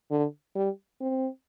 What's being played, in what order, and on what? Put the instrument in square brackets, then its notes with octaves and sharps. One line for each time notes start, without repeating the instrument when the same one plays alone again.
[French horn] D3
G3
C4